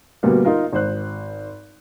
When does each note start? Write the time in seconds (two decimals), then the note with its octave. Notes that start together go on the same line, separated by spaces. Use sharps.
0.23 D2 B2 G3 A#3 B3
0.44 D#4 F4 A#4
0.73 G#1 C5 F#6